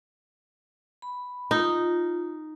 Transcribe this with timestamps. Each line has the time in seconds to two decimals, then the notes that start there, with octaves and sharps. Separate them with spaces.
1.02 B5
1.51 D#4 F4